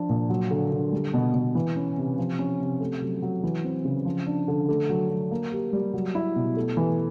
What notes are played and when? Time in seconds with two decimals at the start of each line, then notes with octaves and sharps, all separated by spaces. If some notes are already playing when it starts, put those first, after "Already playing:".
Already playing: F3 D4
0.09 A#2
0.29 F#3
0.50 D3
0.72 D3
0.92 G3
1.14 B2
1.34 B2
1.55 E3
1.76 C#4
1.97 C3
2.18 F3
2.39 C#4
2.60 C3
2.80 A3
3.02 F#3
3.22 F#3
3.43 E3
3.64 C4
3.85 C#3
4.05 F3
4.26 D4
4.48 D3
4.68 A3
4.89 F#3
5.10 F#3
5.31 A#3
5.52 G4
5.73 G3
5.94 F#3
6.15 E4
6.36 B2
6.56 A3
6.77 E3